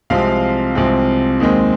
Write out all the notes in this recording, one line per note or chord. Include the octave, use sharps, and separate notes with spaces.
C2 C3 F3 G#3 C4 F5
C2 C3 F3 G#3 C4
D#2 D#3 G#3 C4